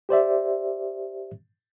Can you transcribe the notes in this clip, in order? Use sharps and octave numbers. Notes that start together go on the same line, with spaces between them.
G4 C5 D5 E5